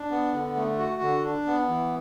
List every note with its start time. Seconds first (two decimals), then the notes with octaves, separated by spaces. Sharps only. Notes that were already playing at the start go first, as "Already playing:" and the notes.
Already playing: D4
0.11 B3
0.33 D3
0.56 A3
0.78 F#4
1.01 D3
1.24 D4
1.46 B3
1.68 E3